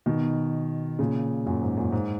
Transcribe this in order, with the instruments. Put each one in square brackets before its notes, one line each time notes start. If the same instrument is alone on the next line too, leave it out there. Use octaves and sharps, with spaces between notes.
[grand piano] B2 D#3
A#2 C#3
F#2 A#2
G#2
F#2 A#2
G#2